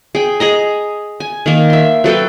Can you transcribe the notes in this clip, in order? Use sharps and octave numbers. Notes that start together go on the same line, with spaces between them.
G#4 G5
G#4 D#5 A#5
G#5
D#3 A#3
E5 C6
F#3 A4 B4 G5